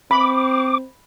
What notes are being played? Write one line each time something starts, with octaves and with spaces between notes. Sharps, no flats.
C4 B5 D6